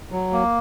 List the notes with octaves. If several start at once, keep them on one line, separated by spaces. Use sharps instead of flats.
F#3
A#3